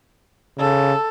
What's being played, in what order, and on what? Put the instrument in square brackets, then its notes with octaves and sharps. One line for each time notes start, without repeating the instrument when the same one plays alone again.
[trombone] C#3 [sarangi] A4